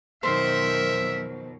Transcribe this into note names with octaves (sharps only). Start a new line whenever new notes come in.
F2 B2 D#3 F#3 A#4 C5 E5